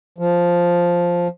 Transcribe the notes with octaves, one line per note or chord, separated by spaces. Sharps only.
F3